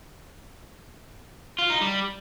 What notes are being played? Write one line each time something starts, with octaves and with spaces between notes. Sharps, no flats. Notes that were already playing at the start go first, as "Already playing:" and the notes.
F4
D#4
G3